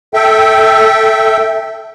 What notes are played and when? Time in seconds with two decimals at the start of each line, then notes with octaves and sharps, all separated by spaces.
0.14 A4 E5 G5